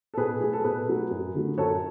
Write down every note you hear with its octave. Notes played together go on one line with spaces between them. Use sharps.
A4
B2 G#4 B4
F#3 A3 G#4
A4
B2 G#4 B4
F#3 A3
F#2
D3 F#3 A3
F#2 A4 C#5